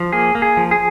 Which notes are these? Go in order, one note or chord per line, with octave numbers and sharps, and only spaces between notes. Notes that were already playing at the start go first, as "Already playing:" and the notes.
Already playing: F3
A#3 G#4
A#3
G#4
F3
G#4